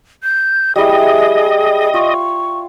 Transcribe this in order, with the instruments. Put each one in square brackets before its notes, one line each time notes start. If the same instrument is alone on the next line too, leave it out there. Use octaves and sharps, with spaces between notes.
[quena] G6
[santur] G3 E4 [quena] G#4 [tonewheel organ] D#5
[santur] F4 [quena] C#6